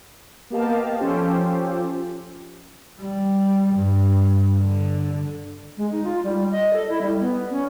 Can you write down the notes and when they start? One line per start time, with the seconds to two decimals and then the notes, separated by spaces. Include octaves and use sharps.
0.50 A#3 B3 G4 D#5 F5 A5
0.98 F3 C#4 F4 G4 A4 C5
3.01 G3
3.74 G2
4.59 D3
5.77 G#3
5.92 D#4
6.04 F4
6.23 G3
6.52 D#5
6.73 A4
6.89 E4
7.01 G3
7.20 B3
7.52 C#4